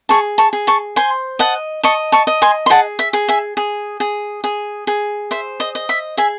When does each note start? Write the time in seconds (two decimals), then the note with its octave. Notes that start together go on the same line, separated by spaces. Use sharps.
0.09 G#4 A5 C#6
0.38 A5 C#6
0.53 G#4
0.67 A5 C#6
0.96 C5 G#5 C6
1.39 D#5 F#5 A5
1.83 D#5 A5 C#6
2.12 A5 C#6
2.27 D#5
2.42 G#5 C6
2.66 C6
2.70 G#4 F#5 A5
2.99 E5
3.13 G#4
3.28 E5 G#5
3.57 G#4
4.00 G#4
4.44 G#4
4.87 G#4
5.31 C5 E5
5.60 D#5
5.75 D#5
5.89 E5
6.17 G#4 E5 G#5